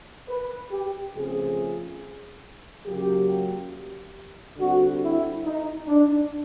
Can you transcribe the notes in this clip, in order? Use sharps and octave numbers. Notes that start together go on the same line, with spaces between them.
B4
G4
C#3 F3 A3 C4 G#4
C#3 F#3 A#3 G4
D3 G3 C4 F#4
E4
D#4
D4